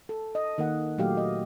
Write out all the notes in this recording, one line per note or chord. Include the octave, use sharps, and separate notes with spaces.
A4
D#5
D#3 A#3 F#5
A#2 F#3 A3 G4 F5
D#5